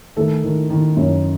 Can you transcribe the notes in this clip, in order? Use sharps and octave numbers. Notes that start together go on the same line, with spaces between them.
D#3 A3 A4
D#3
D#3
F#2